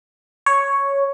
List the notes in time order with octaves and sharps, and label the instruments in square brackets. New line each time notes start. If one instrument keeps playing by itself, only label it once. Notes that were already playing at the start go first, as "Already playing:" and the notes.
[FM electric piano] C#5